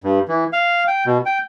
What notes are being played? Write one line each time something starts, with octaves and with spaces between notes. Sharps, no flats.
G2
E3
F5
G5
B2
G5